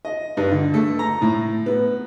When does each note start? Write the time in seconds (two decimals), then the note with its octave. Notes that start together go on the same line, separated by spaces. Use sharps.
0.05 D#5
0.37 G2
0.52 D3
0.74 A3
0.99 A#5
1.22 A2
1.66 B3